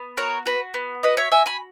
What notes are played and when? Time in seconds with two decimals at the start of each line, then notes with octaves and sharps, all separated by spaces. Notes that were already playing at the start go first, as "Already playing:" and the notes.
Already playing: B3
0.17 F#4 A#4 C#5
0.46 F#4 B4
0.74 B3
1.03 F#4 B4 D#5
1.17 C#5 E5
1.32 F#4 E5 G#5
1.46 G#5 B5